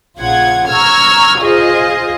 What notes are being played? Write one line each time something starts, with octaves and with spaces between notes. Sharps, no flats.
A#1 C#3 F4 F#5 G#6
A#5 C#6 E6 F6 G#6
F4 G#4 C5 D#5